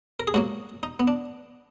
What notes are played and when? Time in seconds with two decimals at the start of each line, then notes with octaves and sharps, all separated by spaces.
0.20 A#4
0.27 G#4
0.34 G#2 F#3 A#3 F#4
0.83 D#4
1.00 B3
1.07 D4